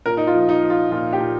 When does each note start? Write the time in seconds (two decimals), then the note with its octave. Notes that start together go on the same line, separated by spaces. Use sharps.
0.06 A#2 A#4
0.17 D#4
0.27 F4
0.34 F3
0.49 D#4
0.62 F3
0.70 F4
0.92 A#2 F4
1.13 G4
1.20 A#2